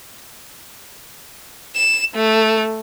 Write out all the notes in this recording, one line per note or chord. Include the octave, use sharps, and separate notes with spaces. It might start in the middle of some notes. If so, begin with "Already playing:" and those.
E7
A3